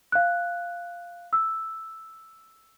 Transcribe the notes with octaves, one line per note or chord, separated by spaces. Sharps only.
F5 F#6
E6